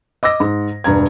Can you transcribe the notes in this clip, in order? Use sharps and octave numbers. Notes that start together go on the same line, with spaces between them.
D#5 D6 E6 A#6
G#2
E1 G2 A#5 G#6